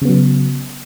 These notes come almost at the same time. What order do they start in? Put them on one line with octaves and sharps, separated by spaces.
C#3 B3 F#3